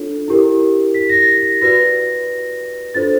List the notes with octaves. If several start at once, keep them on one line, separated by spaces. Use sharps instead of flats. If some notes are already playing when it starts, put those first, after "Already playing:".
Already playing: D4 F4 A4 C#5
E4 G4 A#4
B6
A#6
A6
A#6
F#4 B4 D5 A#6
D4 F4 A4 C5 A6